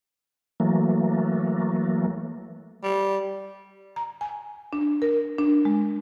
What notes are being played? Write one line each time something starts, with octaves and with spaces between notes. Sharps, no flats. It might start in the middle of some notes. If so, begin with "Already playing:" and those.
E3 F#3 A3 A#3
G3
A#5
G#5
D4
A#4
D4
G#3